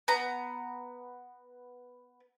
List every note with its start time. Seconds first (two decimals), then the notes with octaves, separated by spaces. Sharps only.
0.08 B3 A#5